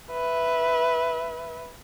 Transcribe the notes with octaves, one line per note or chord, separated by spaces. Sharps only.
B4 E5